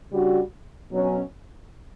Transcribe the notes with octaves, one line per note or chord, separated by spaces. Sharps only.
C#3 G3 D4 F#4
B2 F#3 C#4